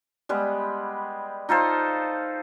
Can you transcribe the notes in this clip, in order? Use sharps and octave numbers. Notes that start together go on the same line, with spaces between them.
G3 G#3 B3
D#4 F4 A4 C5